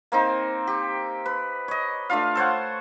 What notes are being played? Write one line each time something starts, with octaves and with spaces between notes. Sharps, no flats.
A#3 C4 D#4
G4
B4
C#5 D#5
A3 D4 F4 F5
A4 C5 C#5 F#5